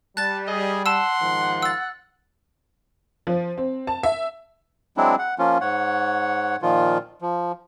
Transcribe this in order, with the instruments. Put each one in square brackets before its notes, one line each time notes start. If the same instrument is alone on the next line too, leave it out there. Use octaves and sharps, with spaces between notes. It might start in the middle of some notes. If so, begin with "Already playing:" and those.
[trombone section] G3 [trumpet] A5 [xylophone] F#6 A6
[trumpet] G#4 [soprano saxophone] D#5
[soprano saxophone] F#5 [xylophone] A5 E6 [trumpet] C6
[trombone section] G#2 D#3 F3
[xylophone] E6 A6
[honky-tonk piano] F3
C4
A5
E5
[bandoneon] F#3 G#3 C4 D4 E4
F#5
F3 A#3 C#4 F4
G#2 C#5 F#5
A#2 D#3 F3 F4
F3